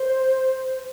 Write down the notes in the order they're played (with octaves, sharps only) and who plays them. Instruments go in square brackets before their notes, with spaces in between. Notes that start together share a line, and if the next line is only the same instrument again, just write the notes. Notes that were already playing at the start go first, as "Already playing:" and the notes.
Already playing: [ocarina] C5